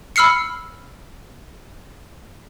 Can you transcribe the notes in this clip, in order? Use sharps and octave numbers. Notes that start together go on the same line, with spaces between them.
B5 E6 F6 C7 C#7